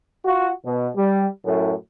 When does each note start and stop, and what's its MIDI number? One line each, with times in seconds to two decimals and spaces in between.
0.25 0.50 65
0.25 0.50 66
0.65 0.89 47
0.96 1.26 55
1.45 1.74 42
1.45 1.74 45